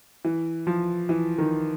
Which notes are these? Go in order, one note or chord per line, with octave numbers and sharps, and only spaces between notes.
E3
F3
E3
D#3